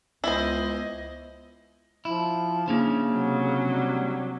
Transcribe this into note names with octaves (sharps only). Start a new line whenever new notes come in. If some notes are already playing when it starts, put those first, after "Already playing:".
C#2 B3 E4 C5 D#5
F3 E4
C#3 A#3 C#4 D4
C3 F#3
G3